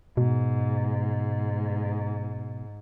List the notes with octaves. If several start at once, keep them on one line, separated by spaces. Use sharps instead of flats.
G#2 B2